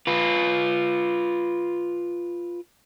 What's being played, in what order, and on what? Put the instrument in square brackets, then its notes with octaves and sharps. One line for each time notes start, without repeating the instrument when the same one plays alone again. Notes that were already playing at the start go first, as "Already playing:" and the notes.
[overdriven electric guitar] F4 B4